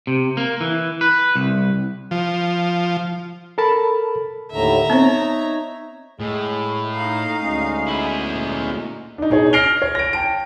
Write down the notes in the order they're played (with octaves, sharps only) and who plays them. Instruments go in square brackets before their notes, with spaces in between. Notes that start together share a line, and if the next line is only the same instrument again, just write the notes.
[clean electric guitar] C3
A#3
E3
B4
C2
[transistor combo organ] F3
[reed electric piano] A4 A#4 A5 B5
[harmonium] D#2 A2 D3 [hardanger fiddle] E5 A#5
[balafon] B3 C4 C5 [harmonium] D#4 C#5
[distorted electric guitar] A2 [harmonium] G#3 G#4
[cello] D#4 F5 [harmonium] A#5
[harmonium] D2 G#3 C#4
[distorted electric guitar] E4 G#4
[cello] A#2
[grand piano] D4 D#4
B2 D#4 G#4 C#5
F6 A#6 C7 D7 F7 G7
C#5
A#6 D7
G5 A5 D7